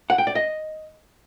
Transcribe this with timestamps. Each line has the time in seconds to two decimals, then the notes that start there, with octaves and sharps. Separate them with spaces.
0.10 F#5
0.18 G5
0.27 D5
0.35 D#5